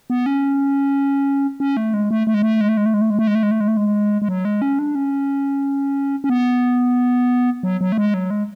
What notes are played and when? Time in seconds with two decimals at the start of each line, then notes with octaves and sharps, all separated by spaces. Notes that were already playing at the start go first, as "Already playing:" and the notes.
0.10 B3
0.26 C#4
1.60 C#4
1.77 A3
1.94 G#3
2.11 A3
2.27 A3
2.34 G#3
2.42 A3
2.61 G#3
2.69 A3
2.77 G#3
2.86 A3
2.94 G#3
3.01 A3
3.10 G#3
3.19 A3
3.27 G#3
3.35 A3
3.43 G#3
3.51 A3
3.60 G#3
3.68 A3
3.77 G#3
4.22 G#3
4.28 F#3
4.45 G#3
4.62 C#4
4.79 D4
4.95 C#4
6.24 C#4
6.29 B3
7.63 F#3
7.81 F#3
7.92 A3
7.98 G#3
8.14 F#3
8.30 G#3